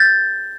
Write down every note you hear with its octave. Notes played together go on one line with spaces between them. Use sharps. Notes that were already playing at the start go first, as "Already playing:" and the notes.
Already playing: G6 A6